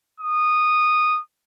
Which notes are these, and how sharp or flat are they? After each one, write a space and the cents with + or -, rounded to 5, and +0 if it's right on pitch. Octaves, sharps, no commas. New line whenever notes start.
D#6 -15